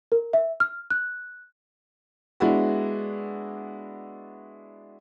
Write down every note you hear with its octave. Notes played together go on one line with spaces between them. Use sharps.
A#4
E5
F6
F#6
G#3 B3 D4 E4 F#4